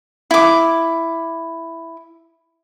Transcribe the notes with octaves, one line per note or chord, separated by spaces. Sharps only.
E4 D6